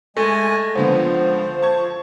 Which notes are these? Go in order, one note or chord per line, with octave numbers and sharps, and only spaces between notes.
G#3 A3 G#5 A#6
C#2 D3 F3 B3 C5
A5 C#6 G#6